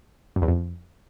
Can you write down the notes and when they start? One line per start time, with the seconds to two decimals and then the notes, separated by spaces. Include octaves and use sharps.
0.36 F#2
0.42 E2
0.48 F2